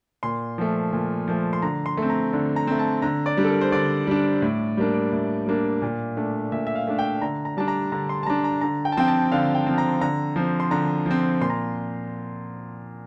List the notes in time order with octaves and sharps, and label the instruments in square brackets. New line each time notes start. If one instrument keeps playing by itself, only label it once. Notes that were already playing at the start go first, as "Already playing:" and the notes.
[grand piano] A#2 C6
F3 A3
A#2
F3 A3
C6
D3 A#5
C6
A3 C4
A#5
D3
A#5
A3 C4
A5
D3 A#5
D5
G3 D4
A4
A#4
C5
D3 D5
G3 D4
A2
G3 A#3 D4
A2
G3 A#3 D4
A#2
A3 D4
A#2 E5
E5
F5
A3 D4
G5
D3 A#5
A#5
G3 D4 A5
A#5
D3 A#5
C6
A5
G3 D4 A#5
A#5
D3 A#5
G5
A5
F3 C4 G5
A5
D3 F5
G5
F3 C4
A#5
D3 A#5
F3 C4
C6
D3 A#5
F3 C4
A#2 C6
A#5